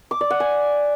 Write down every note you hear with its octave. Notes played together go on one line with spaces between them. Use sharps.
D6
D5
F#5
G#5